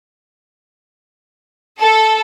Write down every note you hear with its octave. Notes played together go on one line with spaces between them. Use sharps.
A4